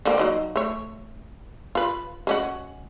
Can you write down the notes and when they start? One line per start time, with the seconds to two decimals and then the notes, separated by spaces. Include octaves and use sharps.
0.05 D3 A#3 C4
0.18 F#3 D#4 D#5
0.56 A3 C#5
1.75 F4 B4
2.27 G#3 C#4 F#4